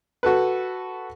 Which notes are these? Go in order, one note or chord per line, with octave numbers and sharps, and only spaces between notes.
F#4 A4 B4